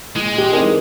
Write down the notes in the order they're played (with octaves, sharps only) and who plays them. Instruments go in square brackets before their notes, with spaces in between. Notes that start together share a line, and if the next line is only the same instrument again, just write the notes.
[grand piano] A#2 [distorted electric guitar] G#3
[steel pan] G4
[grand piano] E3 C4 D#4 [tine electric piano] G#4 A#4 D5